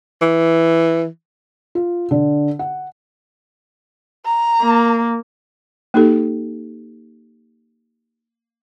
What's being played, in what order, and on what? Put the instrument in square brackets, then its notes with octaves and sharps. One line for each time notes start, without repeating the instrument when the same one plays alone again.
[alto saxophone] E3
[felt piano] F4
D3
F#5
[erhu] A#5
[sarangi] A#3
[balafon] A#3 D#4 G4 A4